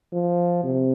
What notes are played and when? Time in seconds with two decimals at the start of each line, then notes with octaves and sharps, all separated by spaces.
0.13 F3
0.64 C3